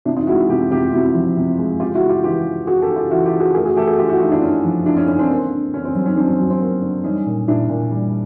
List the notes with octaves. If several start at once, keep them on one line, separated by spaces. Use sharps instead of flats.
C3 D4 E4
D#4 F4
G#3 E4 F#4
C3 F4 G4
C3 F4 G4
C3 E4 F#4
F3
C3
G#3
C#3 F4 G4
E4 F#4
C#3
F4 G4
E3 F4 G4
E3
C#3 F#4 G#4
G4 A4
C#3
F4 G4
E3 E4 F#4
F4 G4
C#3
F#4 G#4
A3 G#4 A#4
F#4 G#4
A3 G4 A4
F#4 G#4
D3 F4 G4
E4 F#4
A3 D#4 F4
D4 E4
D3 C#4 D#4
F3
D3 D4 E4
C#4 D#4
D3 C#4
C4 D4
A#3
D3
D3 C#4
C4
F#3 C#4
C#4 D#4
F#3 C4 D4
C#4
F#3
C4
A#3
D3
G3 C#4 D#4
A#2
A#2 D4 E4
A#2
G3